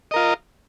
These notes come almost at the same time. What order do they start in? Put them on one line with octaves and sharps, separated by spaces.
D#5 A#4 F4